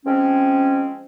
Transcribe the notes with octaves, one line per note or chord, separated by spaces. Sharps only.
F3 G#3 C4 C#4